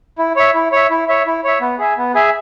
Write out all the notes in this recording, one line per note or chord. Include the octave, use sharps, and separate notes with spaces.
E4
C#5 E5
E4
C#5 E5
E4
C#5 E5
E4
C#5 E5
B3
G#4 E5 G#5
B3
G#4 E5 G#5